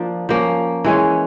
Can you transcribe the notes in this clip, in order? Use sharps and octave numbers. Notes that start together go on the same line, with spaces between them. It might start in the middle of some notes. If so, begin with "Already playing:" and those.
Already playing: F3 A#3 D4
F3 A#3 C#4
E3 G#3 C#4